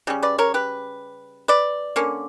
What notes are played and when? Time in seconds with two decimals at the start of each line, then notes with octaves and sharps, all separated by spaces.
0.07 C#3 G3 C#4
0.23 B4 D5
0.38 A#4 C#5
0.54 G4 B4
1.48 B4 D5
1.96 D3 A#3 C#4